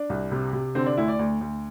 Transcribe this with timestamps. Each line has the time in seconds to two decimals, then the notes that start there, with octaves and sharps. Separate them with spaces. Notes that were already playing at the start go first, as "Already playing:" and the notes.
Already playing: D4
0.09 C2
0.31 C3
0.53 C3
0.75 D3 C4
0.86 D4
0.97 D2 E4
1.08 D5
1.19 D2
1.41 D2